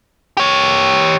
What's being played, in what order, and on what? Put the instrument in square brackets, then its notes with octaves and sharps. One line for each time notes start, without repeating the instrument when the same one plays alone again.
[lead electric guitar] G4 C#5